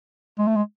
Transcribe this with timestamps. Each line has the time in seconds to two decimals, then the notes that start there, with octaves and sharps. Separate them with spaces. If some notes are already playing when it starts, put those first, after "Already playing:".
0.39 G#3
0.47 A3
0.56 G#3